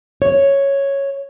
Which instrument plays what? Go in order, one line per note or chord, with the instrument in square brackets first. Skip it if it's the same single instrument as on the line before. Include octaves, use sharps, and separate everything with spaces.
[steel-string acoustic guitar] C#5